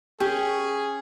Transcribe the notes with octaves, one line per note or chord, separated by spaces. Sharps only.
C#4 G4 G#4